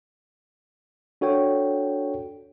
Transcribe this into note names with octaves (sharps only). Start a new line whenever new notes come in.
D4 F#4 A4 C#5 G5